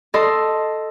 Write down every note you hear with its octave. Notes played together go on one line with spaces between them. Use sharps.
A4 D#5 C6